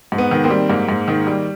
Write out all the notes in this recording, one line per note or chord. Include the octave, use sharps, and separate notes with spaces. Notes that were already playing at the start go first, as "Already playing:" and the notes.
G#2
B3
D#3
A#3 C4
G3
G#2 A#3
G#2
D#3
G3